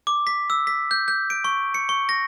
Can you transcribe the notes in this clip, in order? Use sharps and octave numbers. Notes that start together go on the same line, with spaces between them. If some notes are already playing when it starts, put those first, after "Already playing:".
D6
B6
E6
B6
G6
G6
D7
C#6
C#7
C#6
A#6